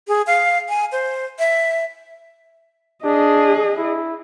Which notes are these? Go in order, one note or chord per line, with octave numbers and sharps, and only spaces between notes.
G#4
F5
G#5
C5
E5
D4 G#4 D#5
E4